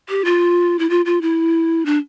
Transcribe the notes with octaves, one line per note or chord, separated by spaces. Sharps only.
G4
F4
E4
F4
F4
E4
D4